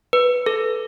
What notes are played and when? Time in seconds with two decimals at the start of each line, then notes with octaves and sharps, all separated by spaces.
0.13 B4
0.46 A4